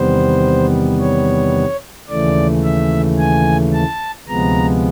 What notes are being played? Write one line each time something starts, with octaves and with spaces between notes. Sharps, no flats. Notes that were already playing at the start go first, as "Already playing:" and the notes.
Already playing: E2 C3 D#3 G3 B3 C5
C#5
D#2 C#3 E3 A3 D5
E5
G#5
A5
D2 C3 F3 G#3 B3 A#5